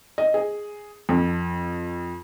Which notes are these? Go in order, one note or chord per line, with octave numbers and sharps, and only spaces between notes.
D#5
G#4
F2